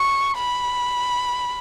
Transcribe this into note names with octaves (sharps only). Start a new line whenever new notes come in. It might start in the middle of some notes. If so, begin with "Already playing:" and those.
Already playing: C#6
B5